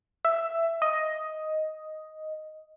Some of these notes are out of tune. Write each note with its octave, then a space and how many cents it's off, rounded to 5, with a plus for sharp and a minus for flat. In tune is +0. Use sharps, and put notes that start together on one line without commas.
E5 +10
D#5 +10